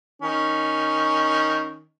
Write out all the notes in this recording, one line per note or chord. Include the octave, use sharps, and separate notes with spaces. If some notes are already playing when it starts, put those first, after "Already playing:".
D#3 C#4